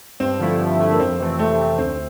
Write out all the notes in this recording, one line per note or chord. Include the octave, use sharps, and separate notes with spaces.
G2 C4
D3 F3 A3 E4
G2
D3 F3 A3 E4
A#3
F2 C4
C3 E3 A3 C4
F2 A3
C3 E3 A3 C4
D2 C4